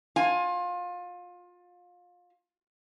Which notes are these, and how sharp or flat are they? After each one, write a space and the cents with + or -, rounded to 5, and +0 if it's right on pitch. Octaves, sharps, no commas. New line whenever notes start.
F4 +25 G#5 +0